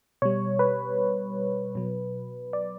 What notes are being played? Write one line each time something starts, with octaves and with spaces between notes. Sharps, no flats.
B2 G3 C#5
B4
B2 F#3
D5